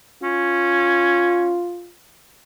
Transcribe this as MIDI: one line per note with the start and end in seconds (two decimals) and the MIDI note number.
0.23 1.62 61
0.23 1.91 65